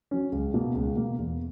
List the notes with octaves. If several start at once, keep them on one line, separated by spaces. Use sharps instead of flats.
F#3 C#4
C#2
B2 A#3
C#2
B2 A#3
E2